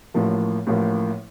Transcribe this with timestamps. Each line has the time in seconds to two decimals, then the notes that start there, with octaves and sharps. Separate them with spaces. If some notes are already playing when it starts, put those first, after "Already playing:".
0.14 A1 A2 F3 A#3
0.67 A1 A2 F3 A#3